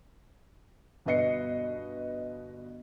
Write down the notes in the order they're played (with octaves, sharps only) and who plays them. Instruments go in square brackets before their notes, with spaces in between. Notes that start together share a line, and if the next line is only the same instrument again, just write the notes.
[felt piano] G1 B2 B4 D#5 C7 C#7